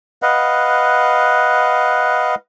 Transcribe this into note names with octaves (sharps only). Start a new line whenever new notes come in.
B4 D#5 F5 F#5